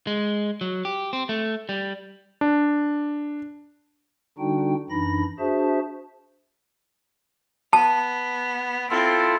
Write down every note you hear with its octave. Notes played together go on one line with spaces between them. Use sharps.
G#3
F#3
G4
C4
A3
G3
D4
D3 G3 D4 D#4 F#4 G5
F#2 E3 D4 D#4 B5 A#6
D4 F#4 G#4 C5 E5 A5
B3 A5
C4 E4 F4 A4